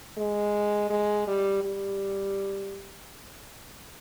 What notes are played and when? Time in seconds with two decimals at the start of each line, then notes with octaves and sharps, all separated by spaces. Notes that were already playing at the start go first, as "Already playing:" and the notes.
0.17 G#3
0.90 G#3
1.27 G3
1.64 G3